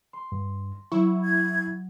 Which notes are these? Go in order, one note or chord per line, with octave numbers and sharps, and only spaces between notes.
C6
G2
F#3 E4 C#6
G#6